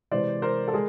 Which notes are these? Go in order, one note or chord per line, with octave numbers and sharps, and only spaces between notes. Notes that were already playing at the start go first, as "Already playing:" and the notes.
C3 E3 G#3 C5 D5
A#4 C5
A4
G#3 G#4 A#4